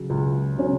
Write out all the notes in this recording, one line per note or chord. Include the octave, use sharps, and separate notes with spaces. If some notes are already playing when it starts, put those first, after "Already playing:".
Already playing: C#3 F#3
C#2
C#3 F#3 C#4